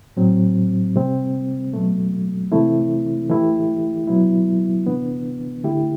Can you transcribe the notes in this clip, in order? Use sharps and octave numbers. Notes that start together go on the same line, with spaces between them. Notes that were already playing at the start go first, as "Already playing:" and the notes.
A2 F#3 C4
C3 G3 C4
B2 F#3 A3
C3 E3 A3 C4 E4
E3 A3 E4 G4
B2 F#3 B3 E4
C3 E3 B3 D4
D3 A3 E4 G4